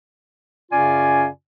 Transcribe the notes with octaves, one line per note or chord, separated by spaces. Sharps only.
F#2 C#3 C#4 F4 D5 G#5